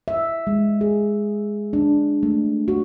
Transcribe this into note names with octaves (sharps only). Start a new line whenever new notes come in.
E5
G#3
G#4
D4
A3
F#4